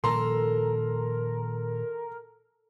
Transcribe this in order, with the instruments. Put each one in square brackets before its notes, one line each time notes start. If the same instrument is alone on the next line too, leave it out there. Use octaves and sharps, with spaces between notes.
[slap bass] A#2 D#3 F3 [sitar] A4 [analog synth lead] A#4 [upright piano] A#5 C6